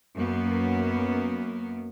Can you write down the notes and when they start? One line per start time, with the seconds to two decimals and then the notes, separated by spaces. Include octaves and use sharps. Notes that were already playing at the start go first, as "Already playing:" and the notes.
0.16 F#2 A#3 B3